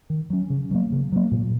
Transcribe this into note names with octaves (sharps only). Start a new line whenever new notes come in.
D#3
F#3 C#4
C#3
F#3 A#3
C#3
F#3 A#3
A#2